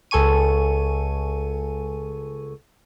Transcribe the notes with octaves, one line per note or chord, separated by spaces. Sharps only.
C#2 A4 G#5 C#6 D#7